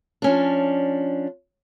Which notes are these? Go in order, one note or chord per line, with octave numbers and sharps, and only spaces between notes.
F3 C#4 D4